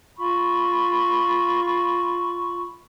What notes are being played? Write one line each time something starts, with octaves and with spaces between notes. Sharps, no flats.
F4 B5 C#6